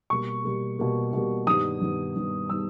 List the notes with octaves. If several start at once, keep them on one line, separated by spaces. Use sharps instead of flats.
B2 G3 A#3 C#6
B2 G3 A#3
B2 G3 A#3
B2 G3 A#3
G2 D#3 G3 B3 D#6
G2 D#3 G3 B3
G2 D#3 G3 B3
D#3 G3 B3 E6